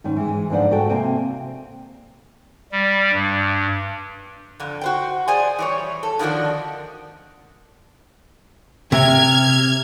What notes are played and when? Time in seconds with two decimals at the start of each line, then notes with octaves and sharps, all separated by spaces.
0.04 G#2 D#3 C#4
0.17 E3 G#3
0.50 G#2 D3 F3 D4 C5 F#5
0.71 G#3 A3 F#4 A4 G5
0.89 C3 A#3 C4 G5 G#5
2.72 G3
3.12 G2
4.60 F2 D3
4.81 F#4 C5 G5
5.28 G#4 C5 D5 G#5
5.59 E3 G3 C#5
6.03 A4
6.19 D3 D#3 F3 D4 F#4
8.92 C3 F6 G#6